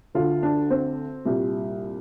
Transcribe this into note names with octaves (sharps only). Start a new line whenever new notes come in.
D2 D3 F4
D4
C4
C2 A#2 G3